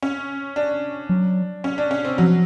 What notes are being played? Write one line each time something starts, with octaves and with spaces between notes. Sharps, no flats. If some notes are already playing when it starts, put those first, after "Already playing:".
C#4
D4
F#3
C#4
D4
C#4
C4
F3 F#3